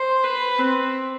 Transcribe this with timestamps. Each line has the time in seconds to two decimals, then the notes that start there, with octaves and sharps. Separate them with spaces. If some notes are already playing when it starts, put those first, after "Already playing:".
Already playing: C5
0.24 B4
0.59 C4